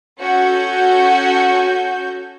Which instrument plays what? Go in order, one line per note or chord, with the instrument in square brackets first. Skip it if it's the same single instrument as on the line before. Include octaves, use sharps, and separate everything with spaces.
[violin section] C#4 F#4 A4 G6